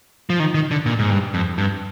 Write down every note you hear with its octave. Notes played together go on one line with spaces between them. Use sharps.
F3
D#3
D#3
D3
A#2
G#2
G2
F2
G2